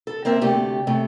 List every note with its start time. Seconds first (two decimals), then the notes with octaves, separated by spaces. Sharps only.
0.07 A4
0.25 A#3 C4 A#4 E5
0.41 D2 C3 A3 G4
0.87 A2 C3 A3